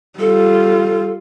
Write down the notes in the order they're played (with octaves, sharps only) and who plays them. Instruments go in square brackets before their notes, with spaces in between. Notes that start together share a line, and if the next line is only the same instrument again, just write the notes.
[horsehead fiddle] G3 F4 [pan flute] A4